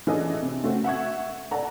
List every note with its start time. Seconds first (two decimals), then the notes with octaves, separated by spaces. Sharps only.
0.07 E3 C#4 D4 G#4 A4 D#5
0.42 C3
0.63 C#3 A3 C4 C#4 F#4
0.84 E5 F#5 C#6 G#6
1.51 A4 D5 F#5 A5 A#5